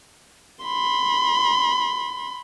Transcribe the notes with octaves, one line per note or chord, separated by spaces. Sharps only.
B5 C6